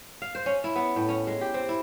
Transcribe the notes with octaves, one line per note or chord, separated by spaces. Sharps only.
F5
C5
C#4
E4
B3
A2
C#4
G#3
G4
C4
E4